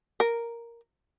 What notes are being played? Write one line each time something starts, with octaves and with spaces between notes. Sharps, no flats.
A#4